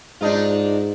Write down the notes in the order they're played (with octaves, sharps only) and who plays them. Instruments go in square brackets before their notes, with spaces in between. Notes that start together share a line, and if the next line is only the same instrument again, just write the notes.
[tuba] G#2 [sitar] D4 D#4 F4